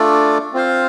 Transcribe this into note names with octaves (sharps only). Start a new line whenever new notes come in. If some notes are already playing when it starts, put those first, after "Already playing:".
Already playing: A3 D4 F4 A4 D5
C4 F4 C5 F5